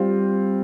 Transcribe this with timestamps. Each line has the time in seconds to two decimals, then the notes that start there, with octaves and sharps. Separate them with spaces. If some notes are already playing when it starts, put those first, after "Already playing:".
Already playing: G3 C4 F4